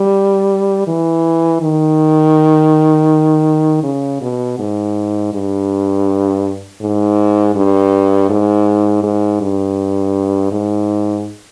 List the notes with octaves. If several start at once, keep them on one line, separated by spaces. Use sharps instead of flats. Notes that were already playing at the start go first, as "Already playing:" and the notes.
Already playing: G3
E3
D#3
C#3
B2
G#2
G2
G#2
G2
G#2
G#2
G2
G#2